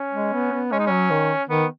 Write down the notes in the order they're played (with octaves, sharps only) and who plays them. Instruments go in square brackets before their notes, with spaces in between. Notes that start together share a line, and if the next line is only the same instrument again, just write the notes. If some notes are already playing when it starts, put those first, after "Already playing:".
Already playing: [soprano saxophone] C#4
[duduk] G#3
B3
B3
[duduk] G#3 [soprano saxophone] C#4
[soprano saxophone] D#4
[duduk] F#3 [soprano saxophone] C#4
[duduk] D#3
[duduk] D#3 [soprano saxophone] B3